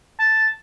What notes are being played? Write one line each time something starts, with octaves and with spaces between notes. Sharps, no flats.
A5